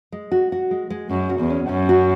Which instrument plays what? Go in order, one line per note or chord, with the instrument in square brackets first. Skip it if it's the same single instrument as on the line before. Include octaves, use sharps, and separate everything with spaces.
[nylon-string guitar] G#3
F#4
F#4
G#3
G#3
[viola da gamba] F#2 [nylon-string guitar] G#3
[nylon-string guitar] F#4
[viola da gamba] E2
[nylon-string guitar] C#4
[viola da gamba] F#2 [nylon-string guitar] C#4
[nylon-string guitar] F#4